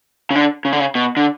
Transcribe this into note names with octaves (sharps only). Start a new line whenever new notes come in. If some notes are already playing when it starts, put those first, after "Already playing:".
C#3
D3
C#3
D3
C#3
B2
D3